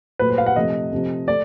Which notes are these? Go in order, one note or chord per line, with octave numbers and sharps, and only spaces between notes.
A#2 F#3 A3 B4
C5
F5
F#5
C3 F3 A3 D#5
C3 F3 A3
A3 D5